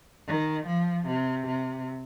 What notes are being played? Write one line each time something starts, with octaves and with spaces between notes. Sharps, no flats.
D#3
F3
C3
C3